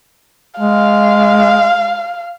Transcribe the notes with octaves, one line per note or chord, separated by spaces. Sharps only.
G#3 F5